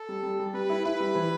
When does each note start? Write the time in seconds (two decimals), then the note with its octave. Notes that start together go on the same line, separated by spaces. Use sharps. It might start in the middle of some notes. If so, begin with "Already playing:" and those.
Already playing: A4
0.09 G3
0.23 G3
0.39 G3
0.54 G3 B4
0.70 E4
0.85 E4 B4
1.00 G3
1.15 E3